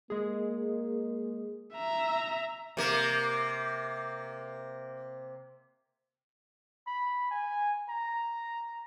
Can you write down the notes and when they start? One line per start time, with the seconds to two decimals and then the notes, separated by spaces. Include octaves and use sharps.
0.10 G#3 A#3 G#4
1.75 E5 A#5
2.77 C3 A#3
6.87 B5
7.31 G#5
7.89 A#5